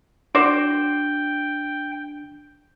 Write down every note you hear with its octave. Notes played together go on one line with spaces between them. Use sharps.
D4 F#4 C5 D5 G5